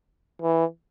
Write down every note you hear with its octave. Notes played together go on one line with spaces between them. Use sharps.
E3